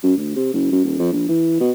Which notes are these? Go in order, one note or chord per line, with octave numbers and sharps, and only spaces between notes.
F#2
D2
C3
F#1
F#2
D#1
F2
A#1
E3
B2